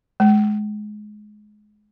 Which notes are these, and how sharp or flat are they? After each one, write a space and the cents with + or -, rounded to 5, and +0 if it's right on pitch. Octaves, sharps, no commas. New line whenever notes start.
G#3 +20